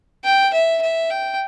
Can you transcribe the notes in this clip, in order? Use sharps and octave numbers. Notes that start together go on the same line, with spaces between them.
G5
E5
E5
G5